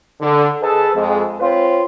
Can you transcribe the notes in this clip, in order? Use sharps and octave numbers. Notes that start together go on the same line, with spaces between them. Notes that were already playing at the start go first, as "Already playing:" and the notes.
D3
G#4 A4 B4 D#5 A5
F2 G#3
C4 F4 B4 C#5